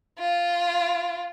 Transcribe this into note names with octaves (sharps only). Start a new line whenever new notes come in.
F4